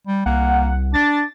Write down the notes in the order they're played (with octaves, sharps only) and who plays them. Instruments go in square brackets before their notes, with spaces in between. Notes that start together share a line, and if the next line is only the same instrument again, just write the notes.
[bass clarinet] G3
[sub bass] C2 [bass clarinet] A#3 [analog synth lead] F#5
[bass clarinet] D4 [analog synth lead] A6